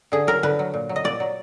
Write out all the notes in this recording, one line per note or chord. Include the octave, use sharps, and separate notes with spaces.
D3 G#4
F#3 A#4
D3 B4
F#3
A#2
F#3
D#5
A#2 D5
F#3